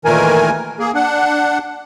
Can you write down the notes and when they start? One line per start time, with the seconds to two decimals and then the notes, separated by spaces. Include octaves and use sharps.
0.05 A#2 D#3 E3 A3 A#4 G#5
0.79 A#3 G#4
0.95 D4 F#5